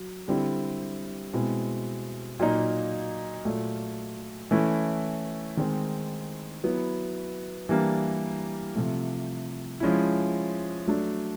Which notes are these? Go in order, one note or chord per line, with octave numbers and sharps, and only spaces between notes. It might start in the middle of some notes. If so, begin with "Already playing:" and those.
Already playing: F#3
D3 G3 C4 E4
B2 G#3 C4 E4
A#2 F#3 A#3 D#4
A#2 F#3 A3
E3 A3 C#4 E4
D#3 G#3 C4
F#3 B3 E4
E3 G3 A#3 D4
C3 F3 A3
F3 G#3 C#4 E4
F#3 A3 D4